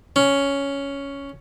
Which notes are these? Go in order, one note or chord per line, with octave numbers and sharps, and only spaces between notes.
C#4